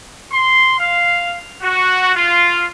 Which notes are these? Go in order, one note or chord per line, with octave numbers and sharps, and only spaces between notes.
C6
F5
F#4
F4